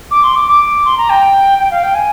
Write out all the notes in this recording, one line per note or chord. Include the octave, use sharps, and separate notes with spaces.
D6
C6
D6
D6
C6
A#5
G5
G5
F5
G5
G#5